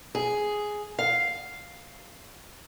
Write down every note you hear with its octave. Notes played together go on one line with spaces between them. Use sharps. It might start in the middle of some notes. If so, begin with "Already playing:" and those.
G#4
F5